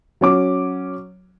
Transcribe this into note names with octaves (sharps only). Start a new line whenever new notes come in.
F#3 C#4 D6